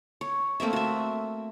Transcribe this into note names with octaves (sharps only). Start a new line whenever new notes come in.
C#5
A3 A#3 C4 E5
F#4 E5